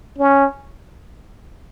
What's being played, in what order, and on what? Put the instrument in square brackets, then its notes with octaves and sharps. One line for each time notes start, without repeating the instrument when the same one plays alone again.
[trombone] C#4